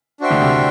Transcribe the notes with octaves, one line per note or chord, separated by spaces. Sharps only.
D4 F#4 C5 E5 G5
D2 D3
C2 C3